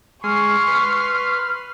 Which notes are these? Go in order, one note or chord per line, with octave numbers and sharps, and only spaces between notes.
G#3 C6 C#6 F6
B4